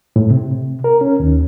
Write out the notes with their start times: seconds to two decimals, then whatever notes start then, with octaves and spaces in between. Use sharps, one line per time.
0.16 A2
0.30 C3
0.84 A#4
1.01 C#4
1.20 D#2